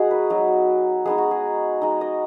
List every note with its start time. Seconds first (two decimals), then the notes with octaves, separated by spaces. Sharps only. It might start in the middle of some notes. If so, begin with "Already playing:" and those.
Already playing: G#3 D#4 F#4 G#4
0.11 B4
0.30 F#3 B3 D#4
1.05 G#3 B3 D#4 G#4
1.18 F#4
1.31 G#4
1.82 G#3 D#4
2.01 D#5